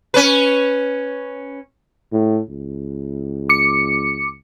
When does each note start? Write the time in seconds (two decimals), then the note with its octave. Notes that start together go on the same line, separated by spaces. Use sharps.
0.14 C#4 B4
2.12 A2
2.49 C#2
3.49 D6 C#7